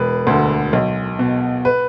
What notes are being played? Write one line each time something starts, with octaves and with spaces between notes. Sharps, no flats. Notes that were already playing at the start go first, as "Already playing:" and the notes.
Already playing: E1 B4
D2 D3
B1
B2
B4